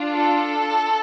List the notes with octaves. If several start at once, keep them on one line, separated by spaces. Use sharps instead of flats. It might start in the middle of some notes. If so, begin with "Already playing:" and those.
Already playing: D4 F4
A4